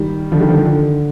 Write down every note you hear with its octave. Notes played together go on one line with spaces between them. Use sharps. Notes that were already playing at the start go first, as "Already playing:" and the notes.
Already playing: D#3 G3
D3 F3
D#3 G3
D3 F3
D#3
D3